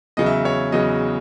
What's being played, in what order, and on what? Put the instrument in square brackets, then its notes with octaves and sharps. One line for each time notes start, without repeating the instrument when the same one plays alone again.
[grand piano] E2 C#3 F#3 D#5
E5
D#5
C#5
E2 C#3 F#3 D#5